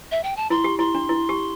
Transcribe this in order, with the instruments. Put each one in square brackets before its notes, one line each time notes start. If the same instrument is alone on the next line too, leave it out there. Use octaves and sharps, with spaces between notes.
[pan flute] E5
G5
A5
[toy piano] E4 [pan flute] C6
[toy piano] G4
[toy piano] E4 [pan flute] C6
[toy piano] D4
E4
G4